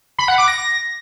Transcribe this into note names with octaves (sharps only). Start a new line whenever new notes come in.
B5
F#5
D6
A#6